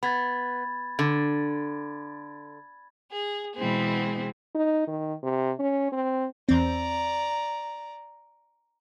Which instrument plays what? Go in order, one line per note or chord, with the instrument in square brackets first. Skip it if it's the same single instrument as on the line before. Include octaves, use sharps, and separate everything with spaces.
[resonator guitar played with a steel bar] B3 [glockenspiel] B5 G#6 A6
[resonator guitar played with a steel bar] D3 [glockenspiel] G#6
[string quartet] G#4
B2 E3 G#3 B3 C4 G#4
[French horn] D#4
D#3
C3
C#4
C4
[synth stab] E2 C4 [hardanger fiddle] D5 A#5